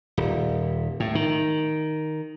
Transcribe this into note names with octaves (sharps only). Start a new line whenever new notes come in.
D#1
A2
D#3